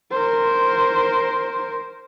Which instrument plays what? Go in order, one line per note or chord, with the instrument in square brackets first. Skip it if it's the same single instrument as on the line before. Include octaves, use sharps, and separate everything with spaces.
[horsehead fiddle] A#4 C5